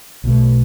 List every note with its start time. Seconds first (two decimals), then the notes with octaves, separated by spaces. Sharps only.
0.24 B1 B2 A3